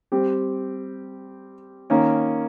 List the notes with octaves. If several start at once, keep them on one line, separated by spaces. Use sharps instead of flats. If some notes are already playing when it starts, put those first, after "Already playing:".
G3 C4 G4
D#3 A#3 C#4